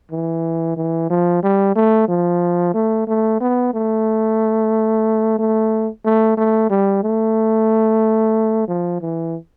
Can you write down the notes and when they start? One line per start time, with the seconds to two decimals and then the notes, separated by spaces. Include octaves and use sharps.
0.12 E3
0.77 E3
1.10 F3
1.43 G3
1.76 A3
2.08 F3
2.74 A3
3.07 A3
3.41 B3
3.74 A3
5.39 A3
6.05 A3
6.37 A3
6.70 G3
7.03 A3
8.68 F3
9.01 E3